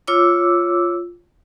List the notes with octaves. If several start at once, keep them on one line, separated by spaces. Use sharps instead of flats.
F4 C#5 D6 E6